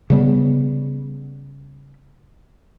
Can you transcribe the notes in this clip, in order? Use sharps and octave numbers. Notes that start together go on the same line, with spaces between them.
C#3 G3 B3